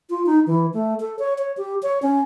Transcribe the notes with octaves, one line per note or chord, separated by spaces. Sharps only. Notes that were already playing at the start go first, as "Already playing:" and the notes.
F4
D#4
E3
A3
A4
C#5
C#5
G4
C#5
C#4